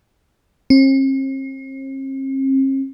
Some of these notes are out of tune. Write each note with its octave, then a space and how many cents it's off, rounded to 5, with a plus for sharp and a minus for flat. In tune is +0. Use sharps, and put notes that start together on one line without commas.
C4 +45